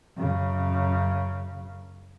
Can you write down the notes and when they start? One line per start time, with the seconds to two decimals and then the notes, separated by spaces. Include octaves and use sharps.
0.17 F#2 C#3